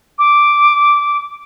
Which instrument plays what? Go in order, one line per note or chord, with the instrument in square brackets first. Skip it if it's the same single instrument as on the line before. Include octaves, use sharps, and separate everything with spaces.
[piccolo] D6